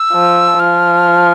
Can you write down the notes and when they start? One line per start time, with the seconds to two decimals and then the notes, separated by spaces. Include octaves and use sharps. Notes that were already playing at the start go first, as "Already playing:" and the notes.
Already playing: E6
0.13 F3
0.59 F3 F6